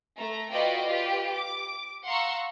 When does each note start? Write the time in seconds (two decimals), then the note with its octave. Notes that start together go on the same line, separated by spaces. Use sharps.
0.17 A3 A#5
0.52 F4 F#4 B4 D5 D#5 G5
0.86 F4 G4 B4
1.34 D6
2.06 F5 F#5 A#5 C6 C#6 E6